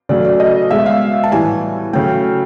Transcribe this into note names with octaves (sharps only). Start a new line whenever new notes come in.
C#3 F#3 A3 D5
D5
D#5
B2 G#3 E5
F5
A5
A2 E3 G3 G#5
C#3 F#3 A3 G5